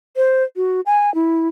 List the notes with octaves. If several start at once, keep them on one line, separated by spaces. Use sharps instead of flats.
C5
F#4
G#5
E4